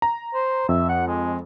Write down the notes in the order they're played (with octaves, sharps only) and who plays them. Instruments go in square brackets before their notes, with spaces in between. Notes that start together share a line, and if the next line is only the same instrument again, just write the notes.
[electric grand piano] A#5
[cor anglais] C5
[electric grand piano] F2 [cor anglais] E5
[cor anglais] F#5
G#3